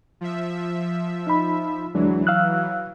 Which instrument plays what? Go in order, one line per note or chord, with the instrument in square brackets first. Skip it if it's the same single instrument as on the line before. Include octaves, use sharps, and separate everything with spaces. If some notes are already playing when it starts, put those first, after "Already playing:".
[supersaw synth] F3 E5
[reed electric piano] D#4 B5
[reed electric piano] D2 G#3 D4 [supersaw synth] E3 F#3
[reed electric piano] F5 E6 F#6